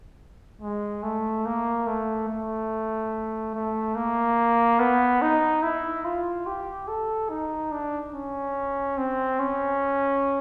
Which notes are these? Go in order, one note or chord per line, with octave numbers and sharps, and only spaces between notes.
G#3
A3
A#3
A3
A3
A3
A#3
B3
D#4
E4
F4
G4
A4
D#4
D4
C#4
C4
C#4